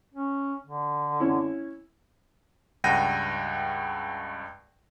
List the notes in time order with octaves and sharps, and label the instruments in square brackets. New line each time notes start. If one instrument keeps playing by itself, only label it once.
[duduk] C#4
D3
[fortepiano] C#4 E4
[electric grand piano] C#2 G2 F#5 G5 A#6 D#7